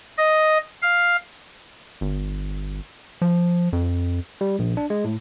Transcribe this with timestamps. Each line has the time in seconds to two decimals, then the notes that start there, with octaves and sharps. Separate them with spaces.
0.18 D#5
0.82 F5
2.01 G1
3.22 F3
3.73 F2
4.41 G3
4.59 A#1
4.77 D4
4.90 G#3
5.04 A2